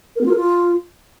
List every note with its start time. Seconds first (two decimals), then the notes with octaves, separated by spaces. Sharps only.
0.16 A#4
0.21 B3
0.26 F4
0.31 A#4
0.36 F4